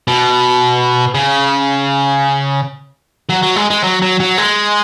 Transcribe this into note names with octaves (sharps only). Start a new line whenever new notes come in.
B2
C#3
F#3
F#3
G#3
G#3
F#3
F#3
F#3
G#3